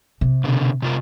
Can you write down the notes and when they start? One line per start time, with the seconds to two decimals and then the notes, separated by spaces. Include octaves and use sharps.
0.21 C3
0.44 B2 D3
0.82 C3 F4 A#4